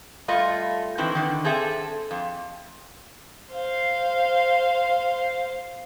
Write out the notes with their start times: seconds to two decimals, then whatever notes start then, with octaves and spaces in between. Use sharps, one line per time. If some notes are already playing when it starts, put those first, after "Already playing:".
0.28 G3 A3 F4 D#5
0.98 D#3 E3 C4
1.15 D3 D#3
1.44 C4 G#4 A4 E5
2.11 F2
3.52 C5 F5